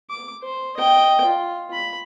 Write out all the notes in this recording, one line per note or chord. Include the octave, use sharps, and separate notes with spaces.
D6
C5
D#5 G5
F4
B5